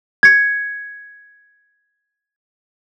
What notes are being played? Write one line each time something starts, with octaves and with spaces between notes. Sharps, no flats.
G#6 C#7